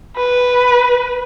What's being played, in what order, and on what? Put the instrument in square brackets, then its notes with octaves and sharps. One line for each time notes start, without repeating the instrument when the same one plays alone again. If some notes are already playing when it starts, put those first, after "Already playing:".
[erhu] B4